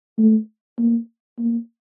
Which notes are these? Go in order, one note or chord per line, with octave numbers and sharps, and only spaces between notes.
A3
A#3
A#3